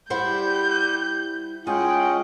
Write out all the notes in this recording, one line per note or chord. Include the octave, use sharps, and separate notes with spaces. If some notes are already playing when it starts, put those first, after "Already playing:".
G3 E4 C5 F#5 G6
G#3 C#4 F4 G#4 F#5 G5